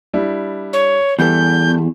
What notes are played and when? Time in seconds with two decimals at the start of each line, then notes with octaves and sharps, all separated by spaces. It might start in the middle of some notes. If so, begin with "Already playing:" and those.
0.13 G3 D4 E4
0.73 C#5
1.19 E2 G3 G4 A4 G6